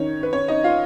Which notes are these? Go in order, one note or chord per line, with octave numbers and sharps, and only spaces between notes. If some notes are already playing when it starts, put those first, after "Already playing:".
Already playing: D#3 C#4 D#4 C#5
B4
C#4 C#5
D#4 D#5
F4 F5